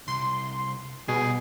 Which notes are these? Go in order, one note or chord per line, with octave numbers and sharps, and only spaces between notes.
C2 C6
B2 G3 F#4 G#4